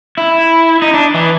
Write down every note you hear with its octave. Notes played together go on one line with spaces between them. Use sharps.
E4
D#4
D4
E3